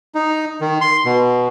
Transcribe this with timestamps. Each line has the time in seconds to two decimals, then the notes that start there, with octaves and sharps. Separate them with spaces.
0.15 D#4
0.61 D#3
0.81 C6
1.05 B2